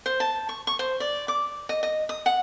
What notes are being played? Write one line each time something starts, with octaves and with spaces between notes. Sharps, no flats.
C5
A5
C#6
C#6
C5
D5
D6
D#5
D#5
D#6
F#5